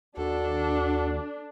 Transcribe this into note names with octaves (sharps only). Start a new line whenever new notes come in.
D#2 D4 F#4 A4